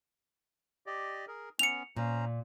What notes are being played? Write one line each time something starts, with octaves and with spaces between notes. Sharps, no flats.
G4 D5 D#5
G#4 A#4
B3 C#4 C#7 F7
A#2 C#4 C5 A#5